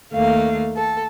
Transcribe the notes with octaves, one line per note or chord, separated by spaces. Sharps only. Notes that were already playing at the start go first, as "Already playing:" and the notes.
D#2 A3 A#3 F5
A4